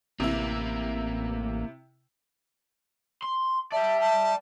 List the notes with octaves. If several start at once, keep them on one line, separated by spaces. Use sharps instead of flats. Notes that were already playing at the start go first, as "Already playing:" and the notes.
A1 C3 A#3 E4
C6
D5 E5 G5 A5
A5